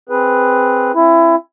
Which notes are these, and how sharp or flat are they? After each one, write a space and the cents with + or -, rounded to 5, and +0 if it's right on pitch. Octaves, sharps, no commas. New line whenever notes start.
C4 +0 G#4 +0 B4 +0
C4 +35 E4 +20